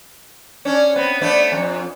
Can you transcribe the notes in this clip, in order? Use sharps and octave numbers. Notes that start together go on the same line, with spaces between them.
C#4 D4
B3 C4
A3 B3 D4
F2